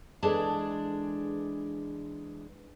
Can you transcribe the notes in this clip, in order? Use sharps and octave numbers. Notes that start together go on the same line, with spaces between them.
E3 G#3 D4 G#4 A4 A5